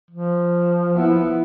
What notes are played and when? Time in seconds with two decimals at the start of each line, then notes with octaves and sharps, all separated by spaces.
0.11 F3
0.95 B3 E4